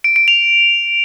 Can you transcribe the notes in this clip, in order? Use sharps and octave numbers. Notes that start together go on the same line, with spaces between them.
D7
D7
F7